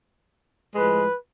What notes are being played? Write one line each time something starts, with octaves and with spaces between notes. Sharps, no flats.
A2 F3 G#3 B4